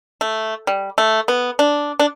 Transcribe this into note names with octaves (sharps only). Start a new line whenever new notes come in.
A3
G3
A3
B3
D4
D4